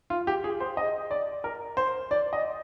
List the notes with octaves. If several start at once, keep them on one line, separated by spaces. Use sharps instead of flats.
F4
G4
G#4
C5
D#5
D5
A#4
C5
D5
D#5